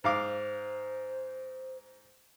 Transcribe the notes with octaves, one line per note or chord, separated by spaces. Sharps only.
G#2 C5 F5 D6